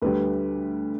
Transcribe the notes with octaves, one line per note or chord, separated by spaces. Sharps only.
D2 D3 G3 B4